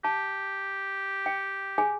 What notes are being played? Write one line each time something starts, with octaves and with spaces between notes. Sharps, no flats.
G4 A5
G5
G#4 G#5